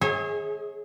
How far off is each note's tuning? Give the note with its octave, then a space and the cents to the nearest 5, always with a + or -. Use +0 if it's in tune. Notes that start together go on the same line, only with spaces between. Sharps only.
G#4 +0 C#5 -30 E5 -45